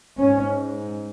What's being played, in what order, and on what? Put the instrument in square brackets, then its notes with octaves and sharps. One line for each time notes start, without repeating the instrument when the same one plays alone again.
[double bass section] G#2 C#4